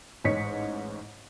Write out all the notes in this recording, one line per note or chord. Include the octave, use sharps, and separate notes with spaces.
A1 G#2 C#5 D#5 B6 C#7